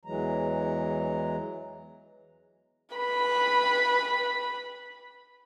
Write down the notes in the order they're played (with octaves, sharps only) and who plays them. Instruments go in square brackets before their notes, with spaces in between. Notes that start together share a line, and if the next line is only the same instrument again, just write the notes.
[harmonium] E2 E3 F#3 G#3 A#5
[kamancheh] B4 B5